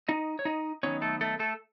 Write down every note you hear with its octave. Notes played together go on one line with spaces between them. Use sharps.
D#4 D#5
C#5
D#4 D#5
D#3 F#3 B3 C#4 D#4 C#5
A3 A4
A3 A4
A3 A4